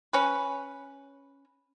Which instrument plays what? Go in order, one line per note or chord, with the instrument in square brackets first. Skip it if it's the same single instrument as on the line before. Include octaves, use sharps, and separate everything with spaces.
[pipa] C#4 B4